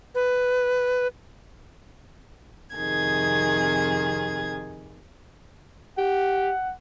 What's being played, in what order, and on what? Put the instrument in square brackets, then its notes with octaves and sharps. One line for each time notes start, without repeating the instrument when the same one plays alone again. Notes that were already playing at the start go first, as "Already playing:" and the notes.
[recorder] B4
[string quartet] F2 C3 D#3 G#4 G#6
[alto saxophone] G4 [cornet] F#5